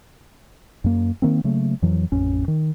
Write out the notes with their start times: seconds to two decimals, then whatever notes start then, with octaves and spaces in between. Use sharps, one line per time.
0.84 F#2 A#3
1.22 D#3 A#3 C4
1.44 C#3 F#3 A3 A#3
1.82 F2 E3 F#3
2.12 A1 F2 C#4
2.48 D#3